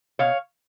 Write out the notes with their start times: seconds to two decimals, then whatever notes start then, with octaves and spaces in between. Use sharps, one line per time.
0.19 B2 C#5 F5